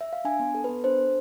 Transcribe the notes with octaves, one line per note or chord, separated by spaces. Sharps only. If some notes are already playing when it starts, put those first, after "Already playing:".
E5
F5
D4 G#5
B3
A4
B4
B3
D4 C5
A4